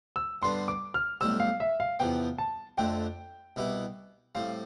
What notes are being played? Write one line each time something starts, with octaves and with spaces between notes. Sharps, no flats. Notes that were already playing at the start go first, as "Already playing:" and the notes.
E6
G2 D3 G3 B3 D4 C6
D6
F6
B1 A2 G3 C4 G4 E6
F5
E5
F5
E2 C3 F3 B3 G5
A5
F2 D3 A3 C4 G5
C2 B2 B3 E4 G4
A2 G3 C4 F5